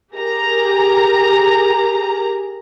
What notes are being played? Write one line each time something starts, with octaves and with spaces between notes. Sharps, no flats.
G4 G#4 A#4 A#5